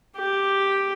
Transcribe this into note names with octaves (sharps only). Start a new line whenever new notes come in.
G4